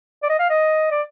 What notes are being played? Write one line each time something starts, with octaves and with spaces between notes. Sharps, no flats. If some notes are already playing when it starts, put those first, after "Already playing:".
D5
D#5
F5
D#5
D5